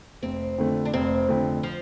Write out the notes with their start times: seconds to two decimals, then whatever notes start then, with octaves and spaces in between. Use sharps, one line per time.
0.23 F1 C4
0.58 F2 D3 A3
0.85 D4
0.94 F1 C4
1.29 F2 D3 A3
1.63 F3